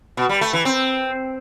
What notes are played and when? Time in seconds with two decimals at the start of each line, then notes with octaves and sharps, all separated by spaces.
0.17 B2
0.29 G3
0.41 A3
0.53 E3
0.65 C4